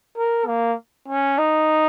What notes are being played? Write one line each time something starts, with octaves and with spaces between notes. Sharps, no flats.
A#4
A#3
C#4
D#4